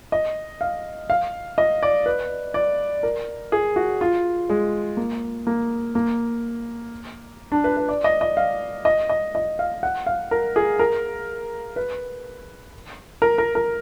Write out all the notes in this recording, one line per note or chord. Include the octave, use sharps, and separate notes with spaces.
D#5
F5
F5
D#5
D5
B4
D5
A#4
G#4
F#4
F4
G#3
A#3
A#3
A#3
D4
B4
B4
D5
D#5
D#5
F5
D#5
D#5
D#5
F5
F#5
F5
A#4
G#4
A#4
B4
A#4
A#4
A#4